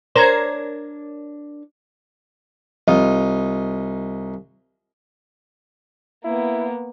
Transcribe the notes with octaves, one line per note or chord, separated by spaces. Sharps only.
D4 A#4 C5 C#5 A#5 G#6
C2 D#4 F4
A#3 B3 E4